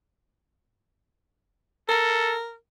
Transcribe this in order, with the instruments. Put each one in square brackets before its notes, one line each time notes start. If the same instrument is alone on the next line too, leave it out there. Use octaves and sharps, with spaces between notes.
[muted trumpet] A4 [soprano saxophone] A#4